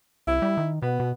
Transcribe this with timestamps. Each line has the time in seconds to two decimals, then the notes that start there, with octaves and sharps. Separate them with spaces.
0.27 C2 E4
0.42 G3
0.57 D#3
0.82 B2 B3
1.00 B2